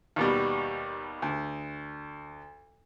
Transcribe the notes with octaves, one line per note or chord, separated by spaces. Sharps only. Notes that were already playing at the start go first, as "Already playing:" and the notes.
D#2 B2 G3
D2